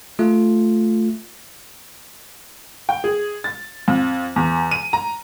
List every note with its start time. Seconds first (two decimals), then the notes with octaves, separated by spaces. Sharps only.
0.19 A3 F4
2.89 G5
3.04 G#4
3.44 A6
3.88 F2
4.36 E2
4.71 D#7
4.93 A#5